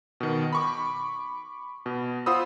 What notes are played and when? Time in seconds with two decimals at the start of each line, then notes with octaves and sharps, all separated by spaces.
0.20 B2 D#3
0.53 B5 C#6 D6
1.86 B2
2.26 F4 C5 F#5 B5 D#6 E6